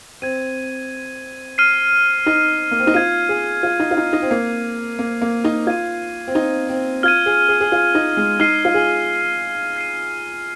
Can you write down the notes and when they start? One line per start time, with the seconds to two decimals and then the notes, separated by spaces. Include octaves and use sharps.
0.22 C4 G#6 D#7
1.58 F6 C7 D#7
2.26 D#4
2.71 A#3
2.79 C4
2.87 D#4
2.94 F4 G#6 D#7
3.29 G#4
3.63 F4
3.80 D#4
3.91 F4
3.97 D#4
4.13 D#4
4.22 C4
4.31 A#3 F6 G#6 C7
4.99 A#3
5.22 A#3
5.44 D#4
5.67 F4 G#6 D#7
6.27 C4
6.35 D#4
6.69 C4
7.03 F4 F6 G#6 D#7
7.26 G#4
7.49 G#4
7.61 G#4
7.72 F4
7.95 D#4
8.17 G#3
8.39 D#4 F6 C7 D#7
8.65 F4
8.74 G#4
9.76 G#6 C7 D#7